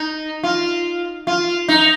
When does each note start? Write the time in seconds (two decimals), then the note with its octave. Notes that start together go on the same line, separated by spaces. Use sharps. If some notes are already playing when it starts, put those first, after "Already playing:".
Already playing: D#4
0.43 F4
1.27 F4
1.68 D#4